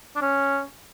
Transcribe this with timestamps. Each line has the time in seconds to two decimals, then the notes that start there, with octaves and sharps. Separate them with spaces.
0.16 D4
0.22 C#4